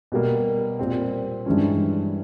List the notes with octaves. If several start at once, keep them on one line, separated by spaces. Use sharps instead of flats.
B2 G3 A#3
A#2 G3 C4
G2 E3 G#3 C#4